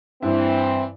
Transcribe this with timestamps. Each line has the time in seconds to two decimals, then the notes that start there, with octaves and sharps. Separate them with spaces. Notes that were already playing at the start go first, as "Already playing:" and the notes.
0.22 G2 E3 C4 E4